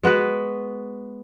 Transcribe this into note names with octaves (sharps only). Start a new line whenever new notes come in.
G#3 B3 F#4 B4